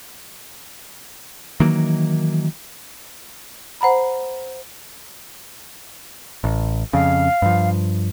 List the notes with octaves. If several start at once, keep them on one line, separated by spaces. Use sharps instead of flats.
D#3 E3 F#3 A#3
C5 F#5 A#5 B5
A1
F2 C#3 F5
G2 F3